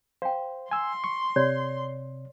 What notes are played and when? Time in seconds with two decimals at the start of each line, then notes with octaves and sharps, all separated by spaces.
0.22 C5 F5 G5
0.71 G#5 C6 E6
1.04 C#6
1.36 C3 C#5 D5